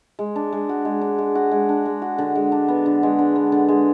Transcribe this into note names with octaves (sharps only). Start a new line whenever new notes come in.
G#3
D4
G#3
F#4
G#3
D4
G#3
F#4
G#3
D4
G#3
F#4
D3
G#3
D4
B3
D3
G#3
D4
B3
D3
G#3